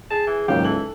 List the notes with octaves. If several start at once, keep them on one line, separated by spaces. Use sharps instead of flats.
G#4 A5
E3
G#1 C#2 F#3 A#3 G4 F5
E3 A4 F#7